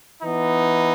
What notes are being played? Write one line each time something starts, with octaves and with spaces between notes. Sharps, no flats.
E3 B3 D#4